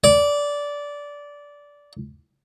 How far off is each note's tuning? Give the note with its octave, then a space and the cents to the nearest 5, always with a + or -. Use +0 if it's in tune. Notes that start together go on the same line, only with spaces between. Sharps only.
D5 -15